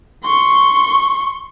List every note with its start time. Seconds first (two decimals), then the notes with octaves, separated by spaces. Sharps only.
0.24 C6 C#6